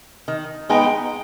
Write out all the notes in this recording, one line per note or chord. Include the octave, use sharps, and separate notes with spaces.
D#3
G#3 B3 D#4 G5